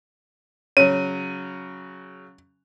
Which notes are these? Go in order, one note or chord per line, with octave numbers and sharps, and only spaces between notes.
C#3 F#3 C#5 D#7